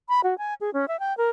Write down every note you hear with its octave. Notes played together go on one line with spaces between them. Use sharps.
B5
F#4
G#5
G#4
C#4
E5
G5
A#4